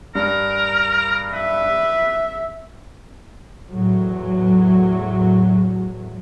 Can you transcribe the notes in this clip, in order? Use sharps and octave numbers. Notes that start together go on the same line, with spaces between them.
G2 A#4
B4 E5
E2 A2 F#3